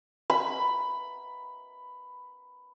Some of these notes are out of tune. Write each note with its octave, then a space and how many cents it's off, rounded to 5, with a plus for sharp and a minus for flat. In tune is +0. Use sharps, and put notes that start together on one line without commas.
B5 +10